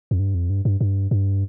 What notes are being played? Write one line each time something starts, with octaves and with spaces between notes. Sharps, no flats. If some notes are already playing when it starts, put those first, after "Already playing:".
F2
G2
F2
G2
G2
G2
G2